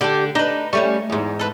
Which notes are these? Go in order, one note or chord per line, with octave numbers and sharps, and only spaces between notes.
D3 G4 A4 D5
D4 D#4 B4
G3 A3 C#4 C#6
E2 G#2
A4 B4